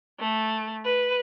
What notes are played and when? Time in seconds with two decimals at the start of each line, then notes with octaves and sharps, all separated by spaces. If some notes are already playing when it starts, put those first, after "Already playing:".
0.20 A3
0.85 B4